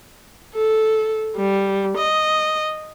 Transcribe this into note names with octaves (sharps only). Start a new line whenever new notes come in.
A4
G3
D#5